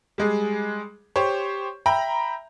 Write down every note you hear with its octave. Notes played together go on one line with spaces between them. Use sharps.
G3 G#3 G#4
G4 C5 C#5 C#6
E5 G5 A#5 B5